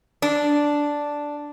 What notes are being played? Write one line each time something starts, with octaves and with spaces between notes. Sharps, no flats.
D4